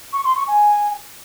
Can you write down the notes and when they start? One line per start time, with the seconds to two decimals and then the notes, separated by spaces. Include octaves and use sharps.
0.13 C#6
0.24 C6
0.36 C#6
0.47 G#5